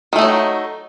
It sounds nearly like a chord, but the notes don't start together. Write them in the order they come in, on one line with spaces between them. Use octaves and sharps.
D#3 A3 D#4 F#3